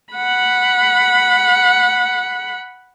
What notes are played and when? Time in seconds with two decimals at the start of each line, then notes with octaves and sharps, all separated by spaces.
0.14 F#5 B5